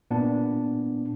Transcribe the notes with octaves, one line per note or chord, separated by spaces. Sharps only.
A#2 B3 D4